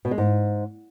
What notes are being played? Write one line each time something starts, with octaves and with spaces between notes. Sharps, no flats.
B2
G#3
G#2